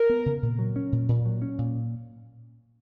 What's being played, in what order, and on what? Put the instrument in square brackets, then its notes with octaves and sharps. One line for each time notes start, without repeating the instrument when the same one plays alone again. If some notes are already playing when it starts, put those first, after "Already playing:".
Already playing: [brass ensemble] A#4
[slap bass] B3
C#3
A#2
F#3
C#4
A#2
A#2
F#3
C#4
A#2